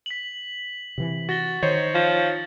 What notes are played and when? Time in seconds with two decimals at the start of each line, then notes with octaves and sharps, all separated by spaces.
0.06 B6 F#7
0.98 C3 E3
1.29 F#4 A6 A#6 G7
1.63 D#3 D#4 C5 C#5
1.95 F3